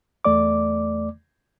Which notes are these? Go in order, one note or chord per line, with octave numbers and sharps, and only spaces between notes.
E2 A3 D5 D6